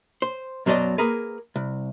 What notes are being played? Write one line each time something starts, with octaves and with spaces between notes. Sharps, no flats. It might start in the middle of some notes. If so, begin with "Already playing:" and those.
C5
F#2 B2 F#3 C5 D5 D#5
A#3 G#4 A#4 B4
C2